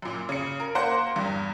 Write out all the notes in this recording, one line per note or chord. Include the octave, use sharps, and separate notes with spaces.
F#2 A#2
C#3 C#7
A#4
A#3 C5 F#5
E2 G2